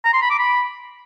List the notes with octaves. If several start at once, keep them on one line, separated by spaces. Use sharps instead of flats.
A#5
C6
B5
D6
B5